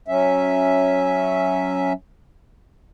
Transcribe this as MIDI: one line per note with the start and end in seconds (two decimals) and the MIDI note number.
0.08 1.93 54
0.08 1.93 61
0.08 1.93 76